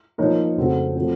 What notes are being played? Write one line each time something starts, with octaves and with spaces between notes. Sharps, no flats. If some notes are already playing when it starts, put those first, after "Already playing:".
F3 A#3 D#4 A#4 C#5
F2 C#3 A3 C4 F#4
F3 A3 C4 F#4